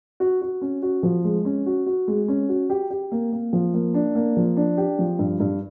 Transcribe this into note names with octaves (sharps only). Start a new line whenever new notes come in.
F#4
F#4
C#4
F#4
F3
G#3
C#4
F#4
F#4
G#3
C#4
F#4
G4
G4
A#3
A#3
F3
A#3
D4
A#3
F3
D4
G4
F3
G2
G2